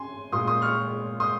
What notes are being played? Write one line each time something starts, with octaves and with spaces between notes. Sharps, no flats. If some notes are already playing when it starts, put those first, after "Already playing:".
Already playing: G#5 C6
A#2 G#3 C6 D#6
C6 D#6
C#6 F6
C6 D#6